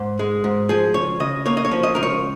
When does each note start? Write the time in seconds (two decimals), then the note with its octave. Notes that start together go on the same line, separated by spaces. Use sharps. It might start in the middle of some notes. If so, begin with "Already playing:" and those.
Already playing: G#2
0.19 G#3
0.44 G#2
0.69 F3 G#4
0.94 C#2 C#5
1.20 C#3 D#5
1.46 A#3 C#5
1.57 D#5
1.65 C#5
1.71 F3
1.83 D#5
1.95 C#2 A#4
2.03 C#5